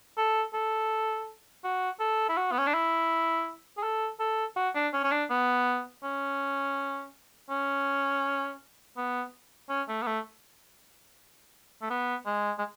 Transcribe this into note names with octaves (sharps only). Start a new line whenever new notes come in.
A4
A4
F#4
A4
E4
F#4
B3
C#4
D4
E4
G#4
A4
A4
F#4
D4
C#4
C#4
D4
B3
C#4
C#4
B3
C#4
A3
B3
A3
A3
B3
G#3
G#3